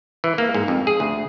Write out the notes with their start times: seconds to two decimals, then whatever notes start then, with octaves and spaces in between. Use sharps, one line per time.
0.24 E3
0.38 A#3
0.54 G#2
0.68 F2
0.87 G#4
1.00 D2